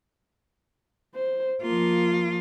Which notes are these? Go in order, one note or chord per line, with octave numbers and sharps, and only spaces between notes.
C5
F3 A#3 F4